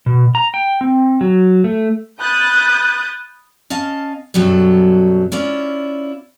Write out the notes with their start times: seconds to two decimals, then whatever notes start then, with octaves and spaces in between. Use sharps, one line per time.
0.06 B2
0.35 A#5
0.54 G5
0.81 C4
1.21 F#3
1.64 A3
2.20 B5 D#6 F#6 G6 A6
3.70 C#4 D#5 F5 A5
4.34 F#2 B2 F#3 G3 A4
5.32 C#4 E4 F4 D5